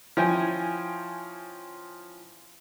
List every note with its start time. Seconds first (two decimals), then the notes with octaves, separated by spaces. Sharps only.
0.17 F3 C#4 E4 G5 G#5